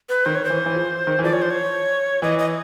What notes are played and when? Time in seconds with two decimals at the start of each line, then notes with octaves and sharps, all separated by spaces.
0.09 B4
0.25 D#3 C5
0.35 C#5
0.45 C5
0.50 E3
0.66 E3
0.75 F3
1.07 D#3
1.19 E3
1.24 F3 D5
1.33 C#5
1.42 C5
1.50 C#5
2.22 E3 D#5
2.39 D#5